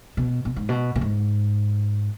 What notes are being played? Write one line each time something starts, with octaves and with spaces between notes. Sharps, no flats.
B2
B2
G#2
B2
B2
G#2